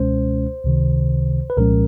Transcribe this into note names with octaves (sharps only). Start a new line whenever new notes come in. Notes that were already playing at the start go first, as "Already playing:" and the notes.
Already playing: C#2 B2 G#3 C#4 C5
C#2 C3 D#3
B4
C2 A#2 F3 G#3 C#4 A#4